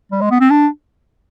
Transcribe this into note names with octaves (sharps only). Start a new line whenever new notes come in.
G3
G#3
B3
C4
D4